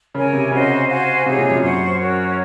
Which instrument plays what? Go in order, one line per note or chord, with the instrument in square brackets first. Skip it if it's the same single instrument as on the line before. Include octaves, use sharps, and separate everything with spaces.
[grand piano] C#3 [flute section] A#4 C#5 G#5
[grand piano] C3
[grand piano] C#3 [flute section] F#4 C5 D#5 G#5
[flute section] F#4 C5 F5 G#5
[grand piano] C3 [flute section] D#4 G#4 C#5
[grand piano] A#2
F#2
[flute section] C5 F#5 C#6
C#4 F#4 A#4 C#5